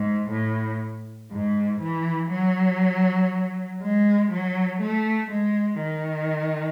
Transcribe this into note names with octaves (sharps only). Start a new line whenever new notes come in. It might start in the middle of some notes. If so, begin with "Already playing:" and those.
Already playing: G#2
A2
G#2
E3
F#3
G#3
F#3
A3
G#3
D#3